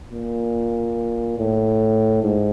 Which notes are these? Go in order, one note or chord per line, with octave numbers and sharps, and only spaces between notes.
A#2
A2
G#2